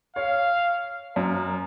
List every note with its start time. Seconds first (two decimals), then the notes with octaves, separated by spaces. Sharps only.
0.16 C#5 F5
1.16 F#2 A#4